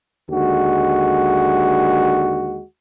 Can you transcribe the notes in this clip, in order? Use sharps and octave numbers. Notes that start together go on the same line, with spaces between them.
D#2 D3 G#3 F#4